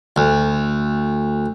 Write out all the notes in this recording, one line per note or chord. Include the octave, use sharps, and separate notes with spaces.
D2